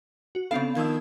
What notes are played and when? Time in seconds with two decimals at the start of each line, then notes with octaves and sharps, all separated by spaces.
0.35 F#4
0.51 C#3 B3 C4 D4 A4 F5
0.76 D#3 F3 E6 G#6